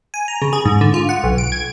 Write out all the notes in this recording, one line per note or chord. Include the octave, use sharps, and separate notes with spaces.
G#5
A#5
C#3
G#4
G#2
D3
F4
F#5
B1
D7
G#6